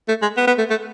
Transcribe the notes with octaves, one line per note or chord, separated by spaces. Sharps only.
A3
G#3
B3
B3
A3
A3